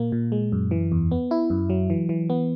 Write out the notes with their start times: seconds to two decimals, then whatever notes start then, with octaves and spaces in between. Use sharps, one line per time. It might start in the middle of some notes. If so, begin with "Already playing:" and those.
Already playing: A#2 A#3
0.12 A#2
0.32 G#3
0.52 F#2
0.71 E3
0.92 E2
1.11 B3
1.31 E4
1.50 F#2
1.70 F#3
1.90 E3
2.09 E3
2.30 B3